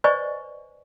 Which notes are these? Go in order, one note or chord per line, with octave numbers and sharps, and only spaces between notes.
B4 C5 D5 D#5 G#5 C#6